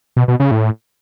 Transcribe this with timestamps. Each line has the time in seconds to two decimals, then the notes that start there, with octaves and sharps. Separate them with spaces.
0.17 B2
0.28 B2
0.40 C#3
0.51 A2